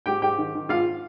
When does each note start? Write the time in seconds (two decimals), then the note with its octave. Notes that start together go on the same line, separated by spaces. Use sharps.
0.06 G#2 G4 G5
0.22 G#2 G4 G5
0.38 D#3
0.54 D#3
0.69 G#2 F4 F5